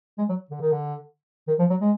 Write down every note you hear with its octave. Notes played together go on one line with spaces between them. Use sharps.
G#3
F#3
D3
D#3
D3
D#3
F3
F#3
G#3